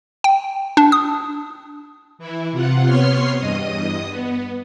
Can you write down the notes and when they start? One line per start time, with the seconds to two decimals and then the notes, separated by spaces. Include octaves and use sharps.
0.24 G5
0.77 D4
0.92 D#6
2.19 E3 E4
2.52 C3 F4 F#5
2.86 C3 B3 C#5 C6 F6 C7
3.38 E2 G2 D#5 D#6
4.08 B3